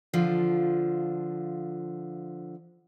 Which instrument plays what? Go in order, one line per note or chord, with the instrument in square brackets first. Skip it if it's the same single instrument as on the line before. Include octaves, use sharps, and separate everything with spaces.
[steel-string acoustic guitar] D3 F3 F4